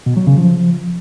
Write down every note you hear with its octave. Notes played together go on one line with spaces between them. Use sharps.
B2
F#3
C#3
F3